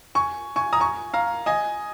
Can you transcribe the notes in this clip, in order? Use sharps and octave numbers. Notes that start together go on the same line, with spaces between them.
G#5 C#6
G#5 C#6
A#5 D#6
G#5 C#6
F5 A#5
D#5 G#5